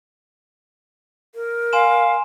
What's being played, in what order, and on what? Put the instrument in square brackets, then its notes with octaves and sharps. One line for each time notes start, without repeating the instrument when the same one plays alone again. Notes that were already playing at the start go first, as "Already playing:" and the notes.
[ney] A#4
[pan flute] F5 [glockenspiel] G#5 C6 E7